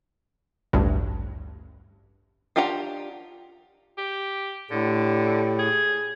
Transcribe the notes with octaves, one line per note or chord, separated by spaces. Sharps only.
A1 D2 G2
D4 F4 G4 F#5 A#5
G4
A2 D3 G4
G#4